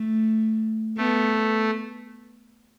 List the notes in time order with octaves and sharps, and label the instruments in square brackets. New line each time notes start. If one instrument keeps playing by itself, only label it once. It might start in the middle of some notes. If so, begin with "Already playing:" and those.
Already playing: [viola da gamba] A3
[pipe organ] A3 [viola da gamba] B3